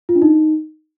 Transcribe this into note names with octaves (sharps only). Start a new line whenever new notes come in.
F4
D4
D#4